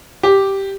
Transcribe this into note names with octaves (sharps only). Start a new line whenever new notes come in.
G4